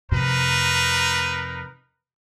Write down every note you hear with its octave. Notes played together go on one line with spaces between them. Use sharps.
F2 C3 D#4 A#4 B4